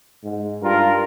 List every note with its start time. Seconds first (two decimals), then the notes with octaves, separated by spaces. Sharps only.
0.24 G#2
0.63 G2 F4 A#4